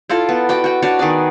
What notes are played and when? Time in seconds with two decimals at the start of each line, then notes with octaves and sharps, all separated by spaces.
0.09 E4 F4 A4 D5
0.29 B3
0.49 F#4 D5 G5
0.64 F#4 G5
0.82 D4 F#4 C#5 D5
0.99 D#3 B3 G#4 D5